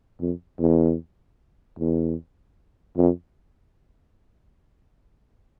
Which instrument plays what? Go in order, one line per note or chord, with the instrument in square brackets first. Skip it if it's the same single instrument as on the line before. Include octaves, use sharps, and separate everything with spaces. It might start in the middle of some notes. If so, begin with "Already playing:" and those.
[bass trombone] F2
E2
E2
F2